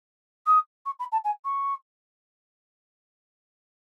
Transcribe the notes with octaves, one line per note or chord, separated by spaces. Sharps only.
D#6
C#6
B5
A5
G#5
C#6